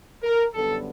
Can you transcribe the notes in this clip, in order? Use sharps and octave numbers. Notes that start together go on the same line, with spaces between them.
A#4
F#2 D3 G3 B3 A4